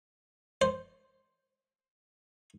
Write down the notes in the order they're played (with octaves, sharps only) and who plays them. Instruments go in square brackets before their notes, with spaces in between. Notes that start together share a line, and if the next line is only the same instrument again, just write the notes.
[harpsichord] C5